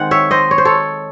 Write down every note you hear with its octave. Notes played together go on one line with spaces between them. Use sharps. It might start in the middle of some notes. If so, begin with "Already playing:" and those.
Already playing: D#3 G#3 C4 F#5
C#5 E5
C5 D#5
C#5
C5
A4 C#5